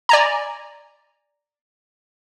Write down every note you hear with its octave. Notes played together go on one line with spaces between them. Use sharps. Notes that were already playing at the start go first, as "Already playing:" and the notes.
D5 G#5 A#5